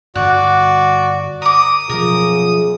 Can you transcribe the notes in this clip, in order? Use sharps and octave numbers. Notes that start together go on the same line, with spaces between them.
G2 D3 F#4 D5 F#6
A#4 D6 D#6
F#2 B2 F3 F4 G#4 A#4 D#6